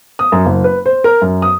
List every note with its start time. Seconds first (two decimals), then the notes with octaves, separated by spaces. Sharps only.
0.19 D#6
0.32 F#2
0.46 F#1
0.64 B4
0.86 C5
1.04 A#4
1.21 F#2
1.42 D#6